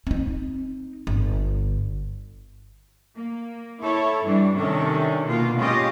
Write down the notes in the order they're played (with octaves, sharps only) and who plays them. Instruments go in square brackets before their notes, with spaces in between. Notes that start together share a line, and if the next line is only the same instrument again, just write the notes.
[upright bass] C4 D#4
G1
[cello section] A#3
E4 A4 C#5
G2 E3 G3 D4
C3 D#3 C#4 D4 A4
B2 A#3 F4
G#3 C#4 F4 G4 D#5